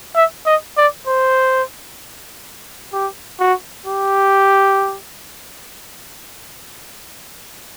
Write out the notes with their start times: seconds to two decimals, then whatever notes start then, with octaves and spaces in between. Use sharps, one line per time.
0.15 E5
0.46 D#5
0.77 D5
1.07 C5
2.93 G4
3.40 F#4
3.86 G4